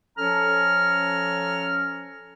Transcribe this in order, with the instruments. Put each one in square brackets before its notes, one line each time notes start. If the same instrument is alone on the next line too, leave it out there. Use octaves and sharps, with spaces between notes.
[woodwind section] F3 C#4 A4 C#5 A#5 F6